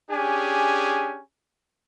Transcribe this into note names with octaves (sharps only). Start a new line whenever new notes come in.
C#4 D4 G4 G#4 G#5